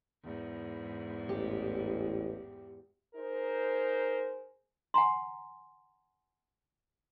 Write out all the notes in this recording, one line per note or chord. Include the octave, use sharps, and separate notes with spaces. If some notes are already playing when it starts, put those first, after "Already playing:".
E2 G#2
A1 G4
D#4 G#4 A#4 C5
F#5 G#5 A#5 C6